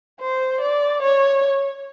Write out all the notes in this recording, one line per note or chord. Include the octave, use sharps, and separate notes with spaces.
C5
D5
C#5